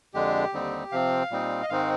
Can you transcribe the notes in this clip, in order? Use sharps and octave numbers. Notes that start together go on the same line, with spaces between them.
F2 D3 G#3 D4 G4
D#2 D3 G3 C4 D#4
C3 F3 C4 F5
A#2 G3 C4 D#4
D#5
G#2 D#3 G#3 C4 D#4 F5